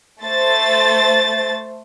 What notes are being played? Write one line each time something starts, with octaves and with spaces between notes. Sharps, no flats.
A3 C5 A6